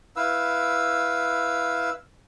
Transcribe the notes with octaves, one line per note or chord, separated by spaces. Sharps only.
E4 B4 F5 E6